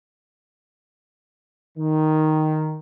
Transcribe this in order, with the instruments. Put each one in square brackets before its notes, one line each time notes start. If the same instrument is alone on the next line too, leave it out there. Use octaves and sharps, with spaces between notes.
[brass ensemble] D#3